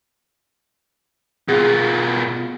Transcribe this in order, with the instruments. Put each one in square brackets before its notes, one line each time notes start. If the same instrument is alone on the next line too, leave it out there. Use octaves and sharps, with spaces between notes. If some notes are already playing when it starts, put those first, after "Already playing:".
[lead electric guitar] B2 F4 [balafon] G#4